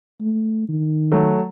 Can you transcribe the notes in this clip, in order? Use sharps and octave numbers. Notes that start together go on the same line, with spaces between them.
A3
D#3
F#3 A3